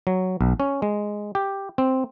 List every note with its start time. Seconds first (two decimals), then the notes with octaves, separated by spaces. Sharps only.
0.07 F#3
0.41 B1
0.60 C#4
0.82 G#3
1.35 G4
1.78 C4